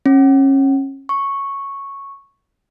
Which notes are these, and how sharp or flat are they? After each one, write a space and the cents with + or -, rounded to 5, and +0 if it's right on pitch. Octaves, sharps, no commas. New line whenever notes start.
C#4 -30
C#6 -5